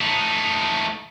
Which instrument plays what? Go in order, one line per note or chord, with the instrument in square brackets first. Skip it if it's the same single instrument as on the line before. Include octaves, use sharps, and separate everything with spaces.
[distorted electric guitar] A3 D#4